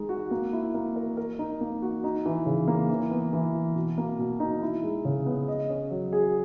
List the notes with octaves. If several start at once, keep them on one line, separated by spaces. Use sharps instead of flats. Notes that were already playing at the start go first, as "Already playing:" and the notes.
Already playing: G#3 D#4
F#4
A#3
E4
A#3
A#4
A#4
D#4
A#3
F#4
D#4
E3
C#3
A#3
E3
B3
E3
E4
B2
A#3
B2
D#4
E4
G#3
C#3
B3
D#5
C#4
F#3
G#4